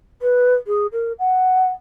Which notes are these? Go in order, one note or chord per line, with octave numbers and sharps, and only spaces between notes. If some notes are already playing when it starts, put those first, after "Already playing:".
B4
G#4
A#4
F#5